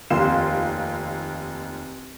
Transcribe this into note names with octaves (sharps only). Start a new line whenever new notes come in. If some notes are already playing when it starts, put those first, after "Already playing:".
F1 D#2 F4 C6 E7